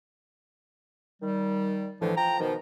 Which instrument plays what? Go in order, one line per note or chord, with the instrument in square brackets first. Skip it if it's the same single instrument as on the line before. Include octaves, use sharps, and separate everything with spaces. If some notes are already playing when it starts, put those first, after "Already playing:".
[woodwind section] D#3 G3
A2 D3 E3 F3
F3 G5 A#5
B2 D#3 F3